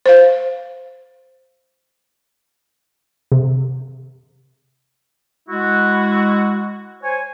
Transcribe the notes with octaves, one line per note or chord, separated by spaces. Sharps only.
C5 F5
C3
G#3 E4 F#4
C5 C#5 G#5